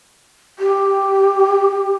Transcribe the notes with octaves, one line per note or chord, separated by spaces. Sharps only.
G4